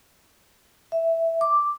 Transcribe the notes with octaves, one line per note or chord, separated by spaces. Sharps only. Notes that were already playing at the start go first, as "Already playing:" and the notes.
E5
D6